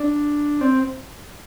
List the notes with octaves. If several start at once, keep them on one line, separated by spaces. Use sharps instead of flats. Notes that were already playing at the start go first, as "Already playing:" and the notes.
Already playing: D4
C4